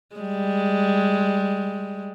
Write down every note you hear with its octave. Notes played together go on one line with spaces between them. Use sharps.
G3 G#3